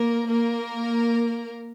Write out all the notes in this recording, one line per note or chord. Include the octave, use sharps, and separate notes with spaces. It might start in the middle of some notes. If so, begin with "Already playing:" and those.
Already playing: A#3 A#4
A#3 A#4